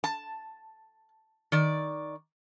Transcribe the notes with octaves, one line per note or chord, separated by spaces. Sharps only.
A5
D#3 D5